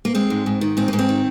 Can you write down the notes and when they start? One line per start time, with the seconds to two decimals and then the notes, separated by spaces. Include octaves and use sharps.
0.05 A#3
0.15 G#3 C4
0.30 G#2
0.46 G#2
0.61 D#3
0.77 G#2 C4
0.88 G#2 A#3
0.99 C4
1.09 D#3